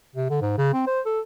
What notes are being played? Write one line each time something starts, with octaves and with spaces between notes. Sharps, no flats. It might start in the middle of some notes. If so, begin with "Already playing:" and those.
C3
D3
G#2
C#3
C4
C5
A4